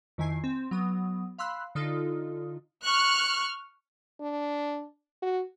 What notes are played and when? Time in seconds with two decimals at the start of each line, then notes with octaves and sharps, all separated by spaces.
0.18 F2 D#3 E4 G#5 C7
0.44 C4
0.71 F#3 B3 D#6
1.38 F5 B5 C6 E6 F#6
1.75 D3 D#4 F4 A4
2.85 C#6 F6 F#6
4.21 D4
5.22 F#4